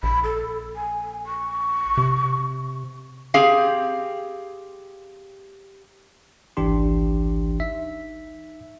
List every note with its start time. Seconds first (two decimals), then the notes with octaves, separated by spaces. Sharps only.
0.03 A#1 B5
0.24 A4
0.76 G#5
1.27 C#6
1.97 C3
3.34 C4 G4 G#4 F5
6.57 G#1 C#2 E3 D4 G4 C6
7.60 D#4 E5 B6